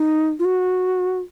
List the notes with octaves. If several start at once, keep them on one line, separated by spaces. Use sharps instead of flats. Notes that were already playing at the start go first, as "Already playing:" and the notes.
Already playing: D#4
F4
F#4